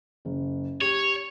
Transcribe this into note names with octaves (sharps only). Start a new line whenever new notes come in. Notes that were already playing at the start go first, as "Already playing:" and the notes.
F#1
G4 C#5